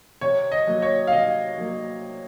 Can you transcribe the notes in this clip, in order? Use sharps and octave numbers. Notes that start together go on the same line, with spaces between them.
C3 C#5
D#5
F#3 A#3
C#5
F5
C3 D#5
F#3 A#3